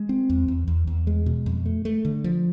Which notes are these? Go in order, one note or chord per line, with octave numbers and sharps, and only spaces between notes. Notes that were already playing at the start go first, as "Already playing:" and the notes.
Already playing: G#3
C4
E2
E2
E2
E2
G#3
B2
F2
A3
A3
D3
F3